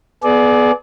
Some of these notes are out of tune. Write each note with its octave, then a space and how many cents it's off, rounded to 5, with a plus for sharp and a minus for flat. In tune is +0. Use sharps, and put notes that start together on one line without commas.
B3 +0 G#4 +35 D5 +0